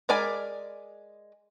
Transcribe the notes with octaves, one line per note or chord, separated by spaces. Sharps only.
G#3 A#4 D5 G#5 B5